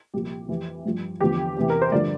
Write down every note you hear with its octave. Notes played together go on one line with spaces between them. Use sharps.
C2 A#2 F3 G4
F2 E3
G2 F3
E2 D3 F3 G4
E2 C3 E3
A#4
C5
G2 D3 F3 D5